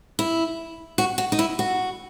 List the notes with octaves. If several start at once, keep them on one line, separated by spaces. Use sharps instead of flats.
E4
F#4
F#4
D#4
E4
F#4